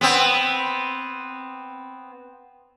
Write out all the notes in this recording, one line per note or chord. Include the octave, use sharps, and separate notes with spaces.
B3 C4